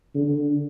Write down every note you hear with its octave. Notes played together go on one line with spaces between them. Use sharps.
D3